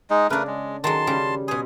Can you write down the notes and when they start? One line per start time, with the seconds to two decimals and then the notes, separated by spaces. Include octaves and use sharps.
0.10 G#3 D#4
0.30 C#3 A3 D4 A#4 B4
0.47 G#3
0.84 D#3 F#3 G#3 A5 C6
1.07 C#3 G3
1.48 B2 C5 G#5 D#6